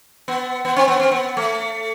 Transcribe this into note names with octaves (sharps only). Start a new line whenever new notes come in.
B3
B3
C4
B3
C4
B3
A3